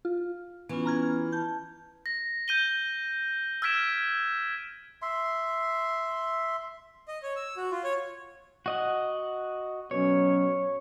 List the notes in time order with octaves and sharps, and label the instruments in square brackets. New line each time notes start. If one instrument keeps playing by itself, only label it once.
[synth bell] F4
[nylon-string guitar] E3 [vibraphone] B3 C#4 F4
[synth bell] A#5 F6 G#6
[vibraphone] A5 [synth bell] G6
[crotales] A#6
G6 D#7 G7
E6 F6 G#6 B6 D7 E7
[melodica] E5 C6
[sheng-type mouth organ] D#5
C#5
E6
F#4
F4
C#5
[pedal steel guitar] F#4 D#5 F#5
[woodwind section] B2 F#3 C#4 [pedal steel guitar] C#5